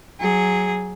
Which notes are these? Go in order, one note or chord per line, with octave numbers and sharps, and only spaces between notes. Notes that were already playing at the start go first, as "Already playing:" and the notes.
F#3 G#4